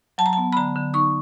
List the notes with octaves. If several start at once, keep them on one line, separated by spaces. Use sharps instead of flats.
F#3 A5
A#5
B3 A5
B5
D3 A#5
D3
D#4 C#6